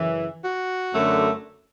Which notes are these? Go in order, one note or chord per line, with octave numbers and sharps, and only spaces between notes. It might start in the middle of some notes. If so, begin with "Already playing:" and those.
Already playing: F#2 C#3 E3
F#4
F#2 D3 A3